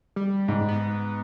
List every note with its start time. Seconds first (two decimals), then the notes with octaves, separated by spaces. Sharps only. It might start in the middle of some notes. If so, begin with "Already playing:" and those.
0.16 G3
0.48 G#2
0.69 B3